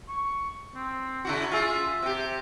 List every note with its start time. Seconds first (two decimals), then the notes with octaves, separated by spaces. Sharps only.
0.09 C#6
0.75 C4
1.25 C#3 E4 F#4
1.52 F4 G#4 E5
2.02 C3 G4